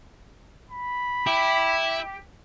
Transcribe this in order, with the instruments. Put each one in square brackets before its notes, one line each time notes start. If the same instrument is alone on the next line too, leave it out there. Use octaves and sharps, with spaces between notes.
[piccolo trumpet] B5
[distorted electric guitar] E4 [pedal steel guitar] G4